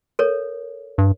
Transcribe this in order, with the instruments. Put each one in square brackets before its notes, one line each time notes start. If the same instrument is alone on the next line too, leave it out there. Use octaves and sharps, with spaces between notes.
[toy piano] A4 A#4 C#5
[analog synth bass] G2